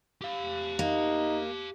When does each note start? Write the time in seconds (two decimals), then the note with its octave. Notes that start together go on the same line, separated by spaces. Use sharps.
0.22 G4 F5
0.79 A#3 D#4